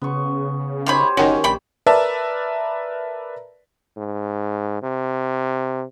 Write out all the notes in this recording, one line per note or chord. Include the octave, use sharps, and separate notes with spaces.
C#3 B3 C#6
D#3 G4 G#4 C5 C#5 B5
F#1 D#3 C#4 F#4
A#1 D5 G5 B5
A#4 B4 D5 E5 A5
G#2
C3